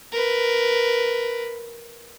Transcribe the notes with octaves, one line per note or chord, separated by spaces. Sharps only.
A#4 B4